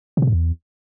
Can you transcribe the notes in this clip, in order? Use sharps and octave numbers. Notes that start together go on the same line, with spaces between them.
C3
B2
G#2
E2